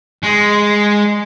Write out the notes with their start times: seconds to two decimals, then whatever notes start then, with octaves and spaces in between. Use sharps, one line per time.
0.23 G#3